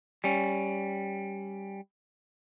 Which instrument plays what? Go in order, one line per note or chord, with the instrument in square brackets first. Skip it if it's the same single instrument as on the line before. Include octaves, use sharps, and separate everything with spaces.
[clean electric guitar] G3 C#4